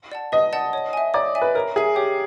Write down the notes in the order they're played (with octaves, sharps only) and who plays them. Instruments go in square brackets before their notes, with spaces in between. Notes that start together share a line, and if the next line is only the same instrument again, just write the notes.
[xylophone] D5 F#5 A5
[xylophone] B4 [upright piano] D#5
[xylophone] D5 F#5 A5
C#5
E5 G#5
[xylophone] C#5 [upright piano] D5
[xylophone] E5 G#5
[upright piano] B4
[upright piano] A#4 [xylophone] C#5
[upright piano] G#4 [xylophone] E5 G#5
[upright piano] G4 [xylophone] C#5